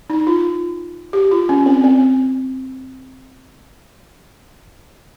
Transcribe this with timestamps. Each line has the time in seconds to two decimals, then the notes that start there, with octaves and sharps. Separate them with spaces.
0.10 D#4
0.27 F4
1.13 G4
1.31 F4
1.49 C#4
1.66 C4
1.84 C4